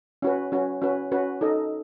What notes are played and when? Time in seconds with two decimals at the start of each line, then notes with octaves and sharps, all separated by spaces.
0.22 C#4 F#4 B4
0.52 C#4 F#4 B4
0.82 C#4 F#4 B4
1.12 C#4 F#4 B4
1.41 D#4 A4 D#5